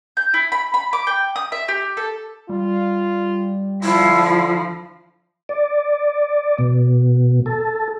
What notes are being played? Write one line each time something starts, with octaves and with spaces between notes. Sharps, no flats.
G6
E4
B5
B5
D6
G5
D#6
E5
G4
A4
G3 F4
D3 F3 E4
D5
B2
A4